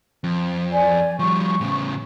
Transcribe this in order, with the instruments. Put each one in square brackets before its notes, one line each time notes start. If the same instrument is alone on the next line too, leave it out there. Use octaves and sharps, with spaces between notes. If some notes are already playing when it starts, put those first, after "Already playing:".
[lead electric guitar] F2
[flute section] D5 G#5
[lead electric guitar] F3 G3 [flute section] C#6
[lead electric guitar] A2 C#3